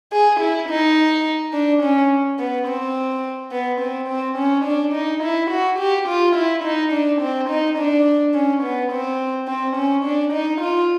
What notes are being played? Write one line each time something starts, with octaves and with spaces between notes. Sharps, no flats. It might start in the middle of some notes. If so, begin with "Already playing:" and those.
G#4
E4
D#4
D4
C#4
B3
C4
B3
C4
C4
C#4
D4
D#4
E4
F#4
G4
F4
E4
D#4
D4
C4
D#4
D4
C#4
B3
C4
C4
C#4
D4
D#4
F4